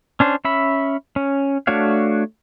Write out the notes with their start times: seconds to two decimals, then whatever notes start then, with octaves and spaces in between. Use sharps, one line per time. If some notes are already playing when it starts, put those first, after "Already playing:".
0.20 C#4 D4 C5
0.45 C#4 E5 B5
1.16 C#4
1.67 A3 D4 F#4 C#5 F5